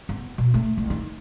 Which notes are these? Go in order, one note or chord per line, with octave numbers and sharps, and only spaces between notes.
B3
B2
A3
C2
D#3